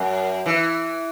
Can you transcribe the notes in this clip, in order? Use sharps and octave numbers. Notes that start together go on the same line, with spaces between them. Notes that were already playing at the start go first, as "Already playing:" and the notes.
Already playing: F#2
E3